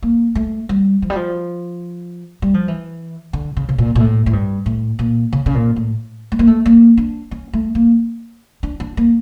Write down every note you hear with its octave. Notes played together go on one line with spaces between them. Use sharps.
A#3
A3
G3
F3
G3
F3
G3
F3
E3
D3
C#3
C#3
A#2
A#2
A2
A2
G2
A2
A#2
C#3
C#3
A#2
A2
A3
A#3
A3
A#3
D4
C#4
A3
A#3
D4
D4
A#3